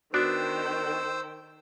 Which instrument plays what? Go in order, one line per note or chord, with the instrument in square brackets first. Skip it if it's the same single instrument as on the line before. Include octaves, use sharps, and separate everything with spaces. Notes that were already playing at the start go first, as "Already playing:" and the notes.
[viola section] D#3 G5 [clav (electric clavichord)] B3 D4 [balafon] F#4 [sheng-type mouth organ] C5 E6